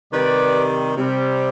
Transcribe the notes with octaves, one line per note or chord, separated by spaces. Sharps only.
C3 D#3 G3 B4 D5
C3 G3